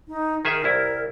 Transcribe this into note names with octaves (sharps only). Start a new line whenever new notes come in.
D#4
D#3 G#4 A#4 E5
C2 E4